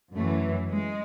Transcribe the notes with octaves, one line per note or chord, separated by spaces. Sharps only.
F#2 E3 A3
G#3